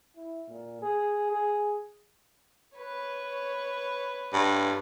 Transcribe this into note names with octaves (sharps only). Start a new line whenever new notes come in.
E4
A#2
G#4
G#4
B4 C#5
G2